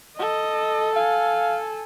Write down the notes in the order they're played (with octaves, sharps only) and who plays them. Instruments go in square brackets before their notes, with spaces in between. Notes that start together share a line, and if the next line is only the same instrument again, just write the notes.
[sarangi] A4 [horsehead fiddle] D#5
[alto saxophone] F5 [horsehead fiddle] G#5